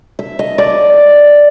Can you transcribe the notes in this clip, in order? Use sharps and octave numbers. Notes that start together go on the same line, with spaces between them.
E5
D#5
D5